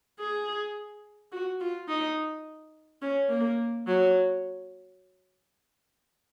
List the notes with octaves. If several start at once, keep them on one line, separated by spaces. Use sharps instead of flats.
G#4
F#4
F4
D#4
C#4
A#3
F#3